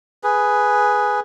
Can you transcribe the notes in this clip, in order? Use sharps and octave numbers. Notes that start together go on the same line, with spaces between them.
G#4 B4